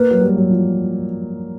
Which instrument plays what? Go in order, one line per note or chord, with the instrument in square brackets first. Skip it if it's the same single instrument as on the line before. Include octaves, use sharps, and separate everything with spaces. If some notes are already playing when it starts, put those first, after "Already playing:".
Already playing: [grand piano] A#3 [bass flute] B4
[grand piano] F#3
G3
F#3
F3